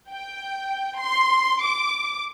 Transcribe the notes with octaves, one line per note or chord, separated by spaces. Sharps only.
G5
C6
D6